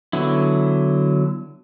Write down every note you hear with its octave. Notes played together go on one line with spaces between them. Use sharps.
D3 F#3 B3 E4